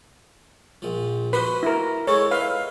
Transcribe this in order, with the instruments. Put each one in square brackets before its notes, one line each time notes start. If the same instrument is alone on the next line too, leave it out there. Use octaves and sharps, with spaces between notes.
[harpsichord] A#1 F3
[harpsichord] F#4 C5 D#5 [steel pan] B4
[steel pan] E4 A#4
[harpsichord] G#3 E4 A4 [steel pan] C#5
[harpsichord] D#4 E5 [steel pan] B4 F5